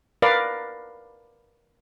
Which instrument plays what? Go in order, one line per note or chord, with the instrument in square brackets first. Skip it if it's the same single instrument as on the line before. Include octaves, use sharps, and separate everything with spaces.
[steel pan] A#4 B4 D5 F5